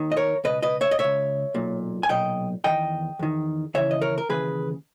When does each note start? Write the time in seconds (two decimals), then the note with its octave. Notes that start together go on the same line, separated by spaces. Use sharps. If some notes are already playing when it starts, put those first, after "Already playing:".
Already playing: D#2 D#3
0.12 D#5
0.17 A#4 C#5
0.44 C#2 B2 B4 D#5
0.63 B4 D#5
0.81 C#5 E5
0.91 D#5
0.99 C#2 B2 C#5 E5
1.54 B1 A#2
2.03 G#5
2.09 B1 A#2 D#5 G5
2.64 E2 D#3 D#5 G5
3.19 E2 D#3
3.74 D#2 C#3 E3 C#5 E5
3.91 D#5
4.01 A#4 C#5
4.18 A#4
4.29 D#2 C#3 E3 G#4 B4